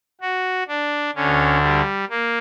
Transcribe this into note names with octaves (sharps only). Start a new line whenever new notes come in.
F#4
D4
D2 D3 C#4
G3
A#3